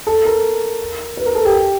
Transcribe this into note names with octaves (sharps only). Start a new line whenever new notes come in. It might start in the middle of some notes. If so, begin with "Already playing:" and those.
A4
A#4
B4
A#4
A4
G4